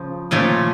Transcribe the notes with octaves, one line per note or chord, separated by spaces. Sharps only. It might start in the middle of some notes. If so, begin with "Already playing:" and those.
Already playing: C#3 F3
A#2 F3 A3 C#4